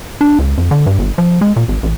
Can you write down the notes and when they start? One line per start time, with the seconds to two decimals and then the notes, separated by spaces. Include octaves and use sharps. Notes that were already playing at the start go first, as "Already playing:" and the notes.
0.21 D4
0.39 C#2
0.58 F2
0.71 D3
0.86 G2
0.99 G1
1.18 F3
1.41 G#3
1.56 A#2
1.68 G#1
1.83 A1